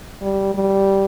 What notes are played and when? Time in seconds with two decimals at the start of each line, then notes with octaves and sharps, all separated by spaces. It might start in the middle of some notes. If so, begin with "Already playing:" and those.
0.22 G3
0.54 G3